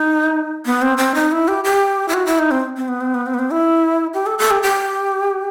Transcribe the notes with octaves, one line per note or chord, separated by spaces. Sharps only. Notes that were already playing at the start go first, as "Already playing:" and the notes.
Already playing: D#4
B3
C4
C4
D#4
E4
G4
G4
E4
F#4
E4
D#4
C4
C4
B3
C4
B3
C4
B3
C4
E4
G4
A4
A4
G4
G4